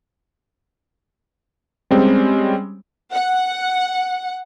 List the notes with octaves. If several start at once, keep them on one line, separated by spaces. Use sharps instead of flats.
G3 G#3 C4 C#4
F#5